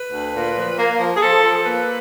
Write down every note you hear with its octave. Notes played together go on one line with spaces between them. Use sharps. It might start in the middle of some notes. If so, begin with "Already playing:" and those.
Already playing: B4
D2
A#2
F3
A#3
F3
G#4
F3 A4
F3
A#3 B4